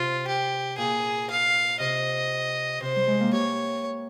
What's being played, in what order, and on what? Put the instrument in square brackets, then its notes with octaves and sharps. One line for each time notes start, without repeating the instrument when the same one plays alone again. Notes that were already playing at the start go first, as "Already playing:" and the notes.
Already playing: [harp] C3 [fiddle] F4
[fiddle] G4
[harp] A#2 [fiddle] G#4
[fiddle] F5
[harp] C3 [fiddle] D#5
[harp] C3 [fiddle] C5
[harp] G3
G#3
A#3
[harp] G4 [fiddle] C#5